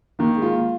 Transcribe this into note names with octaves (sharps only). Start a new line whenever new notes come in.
D#3 A#3
G#3
F4
A#3